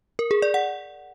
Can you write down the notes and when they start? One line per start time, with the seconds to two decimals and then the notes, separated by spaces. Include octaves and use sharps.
0.19 A#4
0.31 G#4
0.42 D5
0.54 F#5